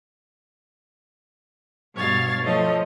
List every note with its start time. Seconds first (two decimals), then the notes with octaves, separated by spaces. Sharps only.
1.95 G2 B2 C#5 F5 A6
2.44 F3 A3 C#5 D#5